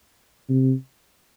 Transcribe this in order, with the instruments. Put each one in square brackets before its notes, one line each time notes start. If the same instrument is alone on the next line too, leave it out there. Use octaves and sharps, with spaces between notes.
[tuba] C3